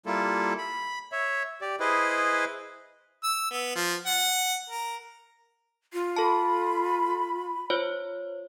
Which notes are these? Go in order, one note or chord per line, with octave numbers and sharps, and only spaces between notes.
G3 A#3 E4 F4 A4
B5
C#5 E5
G4 D5
E4 G#4 B4 C5 D#5
E6
B3
F3
F#5
A#4
F4
A4 A5 B5
F4 C5 C#5